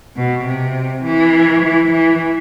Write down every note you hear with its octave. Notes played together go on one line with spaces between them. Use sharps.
B2
C3
E3
E3
E3